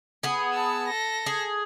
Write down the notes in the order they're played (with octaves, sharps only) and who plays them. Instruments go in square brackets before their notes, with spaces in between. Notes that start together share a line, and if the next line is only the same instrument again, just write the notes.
[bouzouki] B3 G#4
[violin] A5 E6
A4 A#6
[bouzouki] G#4